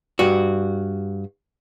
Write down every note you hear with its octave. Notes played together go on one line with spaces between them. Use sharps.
G2 F#4